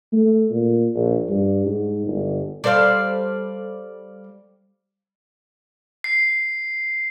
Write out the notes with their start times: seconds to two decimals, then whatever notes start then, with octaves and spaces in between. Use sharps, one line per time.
0.13 A3
0.50 A#2
0.95 A#1
1.29 G2
1.66 G#2
2.07 G1
2.64 G3 A4 C5 D5 F5
6.04 C7